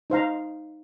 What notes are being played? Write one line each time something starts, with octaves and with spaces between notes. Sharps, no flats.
D#4 C5 F5 A#5